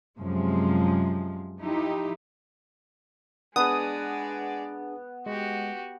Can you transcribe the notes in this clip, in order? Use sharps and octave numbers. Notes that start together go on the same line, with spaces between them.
F#2 C3 F3 G#3
F3 D#4 E4 G4
G#3 B3 D4 G#4 D5 D#6
G#3 F#4 G4